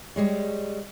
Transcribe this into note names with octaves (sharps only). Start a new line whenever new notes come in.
G3 G#3 C#5